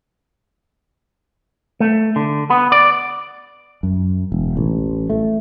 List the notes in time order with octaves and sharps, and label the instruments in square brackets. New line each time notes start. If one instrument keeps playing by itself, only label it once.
[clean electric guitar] A3
D3
B3
D5
[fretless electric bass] F#2
E1
A1
A3